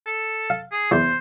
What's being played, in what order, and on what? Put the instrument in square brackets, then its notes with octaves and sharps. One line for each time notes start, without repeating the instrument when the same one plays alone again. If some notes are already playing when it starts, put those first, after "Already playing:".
[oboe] A4
[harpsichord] F5
[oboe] G#4
[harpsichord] E2 E3 [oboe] C5